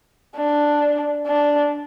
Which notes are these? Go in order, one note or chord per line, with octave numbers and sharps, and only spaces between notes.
D4
D4